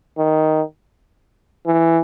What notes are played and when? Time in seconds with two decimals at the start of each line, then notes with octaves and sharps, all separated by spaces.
0.18 D#3
1.67 E3